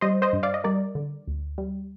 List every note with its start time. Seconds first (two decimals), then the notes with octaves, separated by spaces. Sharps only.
0.01 G3 C5 D#5
0.22 C5 D#5
0.33 G2
0.43 D5 F5
0.54 D#5
0.64 G3 A#4 D5
0.95 D3
1.27 D2
1.58 G3